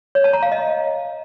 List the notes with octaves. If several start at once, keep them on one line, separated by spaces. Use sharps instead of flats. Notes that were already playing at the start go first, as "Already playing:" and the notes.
C#5
A5
A#5
F5
D#5